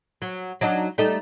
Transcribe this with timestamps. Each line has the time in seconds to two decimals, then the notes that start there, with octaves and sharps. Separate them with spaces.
0.22 F#3
0.61 F#3 D4 D#4
0.98 G3 A3 D#4